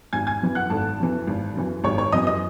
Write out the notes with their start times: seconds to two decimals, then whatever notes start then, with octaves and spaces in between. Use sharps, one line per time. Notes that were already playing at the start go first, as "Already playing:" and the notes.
0.13 G#1 G#5 G#6
0.27 G#5 G#6
0.42 F#2 E3
0.55 F#5 F#6
0.70 G#1 A4 A5
0.99 F#2 E3
1.27 G#1
1.56 F#2 E3
1.84 G#1 C#5 C#6
1.98 C#5 C#6
2.12 F#2 E3 D#5 D#6
2.27 D#5 D#6